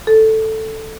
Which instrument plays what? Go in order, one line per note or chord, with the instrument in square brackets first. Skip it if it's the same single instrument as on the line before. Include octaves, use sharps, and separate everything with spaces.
[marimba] A4